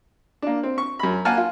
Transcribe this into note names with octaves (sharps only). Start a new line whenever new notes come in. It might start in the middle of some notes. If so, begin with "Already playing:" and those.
A#3 D4
C4
C#6
F#2 B5
A#3 F#5 G#5 A5 F6
F4